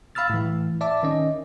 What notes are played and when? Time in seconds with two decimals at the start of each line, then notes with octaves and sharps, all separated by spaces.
0.15 F5 B5 E6 F6 A6
0.30 A2 E3
0.81 D5 E5 A5 D6
1.03 D#3 C#4 D#5